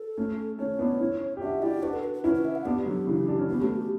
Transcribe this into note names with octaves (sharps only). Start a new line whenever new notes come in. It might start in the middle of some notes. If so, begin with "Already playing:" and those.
Already playing: A4
A3 C#4
A3 C#4 C#5
B3 D4
C#4 E4
G4
D4 F#4 E5
E4 G4 D5
D4 F#4 B4
A4
B4
B4
C#4 E4 B4
B4
E5
F#5
B3 D4 G4
D3 F#3
C#3 E3
D4
C#4
B3 G4
A3 C#4 F#4
G4